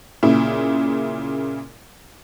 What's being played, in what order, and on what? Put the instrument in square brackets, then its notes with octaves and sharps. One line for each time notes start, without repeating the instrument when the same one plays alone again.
[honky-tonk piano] A#2 C#3 E4